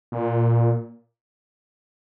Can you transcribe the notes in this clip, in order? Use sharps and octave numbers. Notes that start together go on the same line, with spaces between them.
A#2